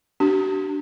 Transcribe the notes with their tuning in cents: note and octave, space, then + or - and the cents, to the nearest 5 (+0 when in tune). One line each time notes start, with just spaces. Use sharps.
D4 +0 G4 -45